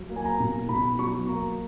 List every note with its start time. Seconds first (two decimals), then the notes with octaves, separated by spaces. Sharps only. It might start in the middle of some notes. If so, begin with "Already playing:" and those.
Already playing: F#3
0.10 A#3
0.16 G#5
0.25 A#5
0.40 B2
0.69 B2 B5
0.99 F#3 C#6
1.28 A#3 A#5